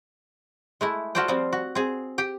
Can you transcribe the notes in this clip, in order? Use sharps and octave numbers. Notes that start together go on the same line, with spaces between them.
G#3 A3 E4
F4 F#4 A4 C5 D5 G5
F3 G3 C4
F#4
C4 G#4
G4 G5